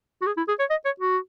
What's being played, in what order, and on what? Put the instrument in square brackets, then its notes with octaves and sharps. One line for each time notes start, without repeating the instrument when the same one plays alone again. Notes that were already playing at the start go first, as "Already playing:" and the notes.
[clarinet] F#4
G#4
E4
G#4
C#5
D#5
C#5
F#4